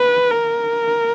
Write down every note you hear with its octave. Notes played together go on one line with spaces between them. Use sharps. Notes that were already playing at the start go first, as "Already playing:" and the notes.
Already playing: B4
A#4